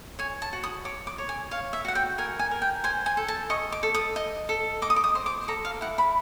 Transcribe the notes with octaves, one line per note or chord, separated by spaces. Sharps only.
C#5 G#5
A5
F#4
D#6
C#5 D6
D6
C#5
G#5
C#5 F5
E5
F#4 F#5
G5
A#4 G#5
G#5
A#4
G5
C5 G#5
G#5
A4
A5
D#5 C#6
D6
A4
D#6
D#5
A4
D#5 D6
D#6
D6
D#6
C5
D6
A4 A#5
F5
E4 F#5
B5